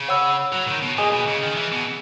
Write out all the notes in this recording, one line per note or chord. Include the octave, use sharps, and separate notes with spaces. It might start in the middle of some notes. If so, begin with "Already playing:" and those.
Already playing: C#3
C#5 F#5 B5 E6
F#3
D#3
B2
A#2 G#4 D#5 G#5 D#6
B2
C#3
D#3
E3
B2